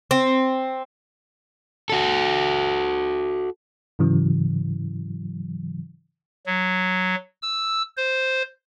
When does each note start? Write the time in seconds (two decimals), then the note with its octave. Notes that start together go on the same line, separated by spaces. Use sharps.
0.11 C4
1.90 F#4 A4
3.99 G#2 C#3 E3 F#3
6.46 F#3
7.42 E6
7.97 C5